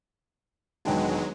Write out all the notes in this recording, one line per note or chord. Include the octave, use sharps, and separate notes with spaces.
E1 D#3 F#3 G#3 D4 B4 G5 A5